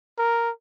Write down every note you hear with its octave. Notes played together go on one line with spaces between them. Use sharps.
A#4